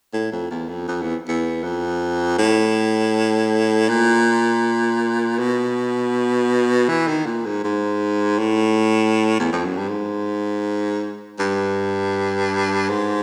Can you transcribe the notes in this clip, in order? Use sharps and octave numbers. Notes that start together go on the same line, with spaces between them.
A2
F2
E2
F2
F2
E2
E2
F2
A2
A#2
B2
E3
D#3
A#2
G#2
G#2
A2
E2
F2
F#2
G2
G#2
G2
G#2